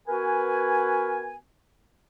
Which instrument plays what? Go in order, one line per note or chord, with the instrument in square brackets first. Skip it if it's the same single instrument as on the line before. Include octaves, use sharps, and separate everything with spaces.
[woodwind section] B3 F#4 A#4 B4 G#5